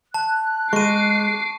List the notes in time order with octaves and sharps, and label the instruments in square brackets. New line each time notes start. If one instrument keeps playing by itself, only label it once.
[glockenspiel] A5 [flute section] F#6
[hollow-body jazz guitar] G#3 [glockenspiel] C#6 D#7 [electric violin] D6 C7